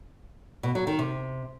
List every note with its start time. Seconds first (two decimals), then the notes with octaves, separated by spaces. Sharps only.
0.63 B2
0.75 F#3
0.87 D#3
0.99 C3